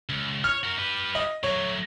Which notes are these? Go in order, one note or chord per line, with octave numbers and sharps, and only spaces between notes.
C#2
C#5 F6 F7
F#4 A#4
G4 B4
D#5
F#3 A3 C#5